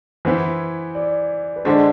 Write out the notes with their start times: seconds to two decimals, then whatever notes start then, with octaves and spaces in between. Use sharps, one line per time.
0.25 E3 B3 E4 C5
0.95 D5
1.56 B4
1.65 D3 G#3 D4 C5